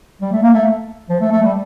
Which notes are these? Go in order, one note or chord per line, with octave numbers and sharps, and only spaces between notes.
G3
A3
A#3
A3
F3
A3
A3
G3